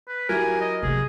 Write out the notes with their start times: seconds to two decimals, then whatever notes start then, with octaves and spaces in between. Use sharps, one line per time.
0.08 B4
0.29 F#3 E4 G4 A#4 G#5
0.61 D#5
0.83 C3 A#3 G#4